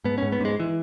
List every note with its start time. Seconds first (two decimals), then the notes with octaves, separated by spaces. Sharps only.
0.04 G#2 B3
0.18 C#4
0.22 G#2
0.32 B3
0.40 G#2 G#3
0.60 E3